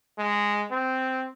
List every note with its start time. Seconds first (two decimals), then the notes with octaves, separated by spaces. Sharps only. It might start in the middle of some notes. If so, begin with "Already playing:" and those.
0.18 G#3
0.71 C4